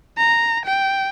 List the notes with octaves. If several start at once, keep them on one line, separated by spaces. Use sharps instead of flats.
A#5
G5